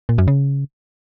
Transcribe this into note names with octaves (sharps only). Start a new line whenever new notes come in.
A#2
F#2
C#3